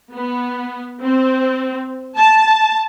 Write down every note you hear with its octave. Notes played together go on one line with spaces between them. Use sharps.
B3
C4
A5